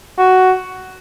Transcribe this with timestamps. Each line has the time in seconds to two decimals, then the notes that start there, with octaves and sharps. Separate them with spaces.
0.19 F#4